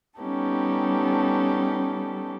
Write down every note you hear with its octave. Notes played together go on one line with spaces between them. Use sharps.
G3 B3 C#4 D#4 G4 A4